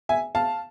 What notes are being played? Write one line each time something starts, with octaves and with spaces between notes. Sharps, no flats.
E5 G#5
F5 A5